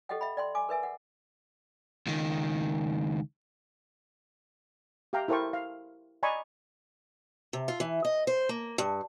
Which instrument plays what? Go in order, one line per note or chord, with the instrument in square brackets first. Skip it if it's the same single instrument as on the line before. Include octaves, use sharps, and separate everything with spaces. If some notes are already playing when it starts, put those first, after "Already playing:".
[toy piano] G4 A4 D#5 F#5 G5
E5 G5 B5
D5 G5 C6
G#5 D6
A#4 B4 E5 G#5
F#5
[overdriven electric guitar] C#2 D#3
[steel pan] G4 E5 F5 G5 A#5
E4 A4 A#4 C5 G5 C#6
F5
D5 D#5 G#5 A#5 B5 C#6
[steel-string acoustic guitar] C3
F4
E3
D#5
C5
A#3
G2